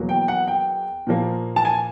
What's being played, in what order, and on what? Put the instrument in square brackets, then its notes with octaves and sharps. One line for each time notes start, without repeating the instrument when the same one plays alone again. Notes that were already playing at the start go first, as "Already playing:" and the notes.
Already playing: [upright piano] E2 B2 F#3 A#3
G5
F#5
G5
A#2 F3 A#3
A5
G#5